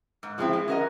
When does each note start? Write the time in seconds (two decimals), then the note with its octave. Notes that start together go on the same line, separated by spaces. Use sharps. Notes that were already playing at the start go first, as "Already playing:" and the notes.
0.23 G#2
0.38 F3 G#3 C4 E4
0.53 G#3
0.68 C#4 F#4 A#4 D#5